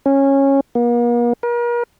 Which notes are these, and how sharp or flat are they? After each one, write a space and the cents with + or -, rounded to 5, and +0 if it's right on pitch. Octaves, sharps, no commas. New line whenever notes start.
C#4 -15
A#3 +45
A#4 +40